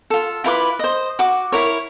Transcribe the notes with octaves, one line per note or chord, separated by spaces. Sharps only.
F4 A4
E4 F4 B4 D6
C5 D#5
F#4 D6
E4 A#4 C#5